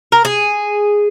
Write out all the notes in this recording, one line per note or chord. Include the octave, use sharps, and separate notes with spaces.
A#4
G#4